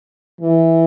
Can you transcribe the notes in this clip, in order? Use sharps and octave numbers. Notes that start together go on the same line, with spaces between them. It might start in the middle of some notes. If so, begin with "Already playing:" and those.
E3